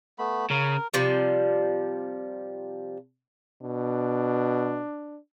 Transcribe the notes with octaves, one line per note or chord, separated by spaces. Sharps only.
A3 B3 B5
C#3 A#4
C3 F3 G3
B2 D4